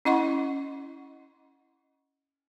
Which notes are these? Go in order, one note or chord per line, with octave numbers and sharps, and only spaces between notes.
C#4 E4 D#5 F#5 C6 C#6